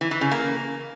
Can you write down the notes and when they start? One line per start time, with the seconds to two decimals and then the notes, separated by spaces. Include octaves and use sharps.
0.01 E3
0.11 E3
0.21 C#3
0.31 A#3